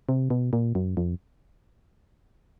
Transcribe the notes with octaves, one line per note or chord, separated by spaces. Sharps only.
C3
B2
A#2
F#2
F2